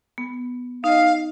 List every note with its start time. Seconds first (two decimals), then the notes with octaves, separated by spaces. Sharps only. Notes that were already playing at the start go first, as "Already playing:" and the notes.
0.18 B3
0.84 D#4 D#5 F5